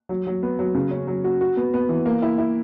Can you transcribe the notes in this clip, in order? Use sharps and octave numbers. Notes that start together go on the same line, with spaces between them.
F#3
F#3
B3
F#3
C#3
C#4
F#3
F#4
F#4
B3
B3
E3
A#3
E4
E4